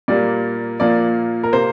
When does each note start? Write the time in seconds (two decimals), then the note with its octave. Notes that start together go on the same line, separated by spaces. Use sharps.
0.08 A#2 G3 A#3 D5
0.80 A#2 F3 A#3 D5
1.43 A#4
1.53 C3 A#3 C5